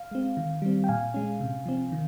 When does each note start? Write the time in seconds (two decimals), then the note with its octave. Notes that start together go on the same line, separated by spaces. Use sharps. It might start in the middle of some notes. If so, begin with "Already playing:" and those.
Already playing: F5
0.11 G#3 C4
0.37 D#3
0.62 G3 C4
0.84 G5
0.89 A#2 F5 G#5
1.14 G#3 C#4
1.40 C3
1.66 F3 C4
1.92 D#3